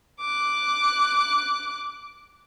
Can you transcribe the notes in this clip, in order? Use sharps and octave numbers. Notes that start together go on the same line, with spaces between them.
D6 F#6